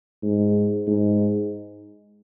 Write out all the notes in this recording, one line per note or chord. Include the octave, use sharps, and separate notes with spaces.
G#2
G#2